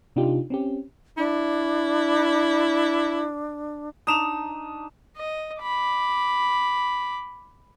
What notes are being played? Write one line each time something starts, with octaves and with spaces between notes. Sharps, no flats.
C3 D4 D#4 F4 G4
C4 C#4 G4
D4 E4
D4 D#4 D#6 E7 F7
D#5
B5 D6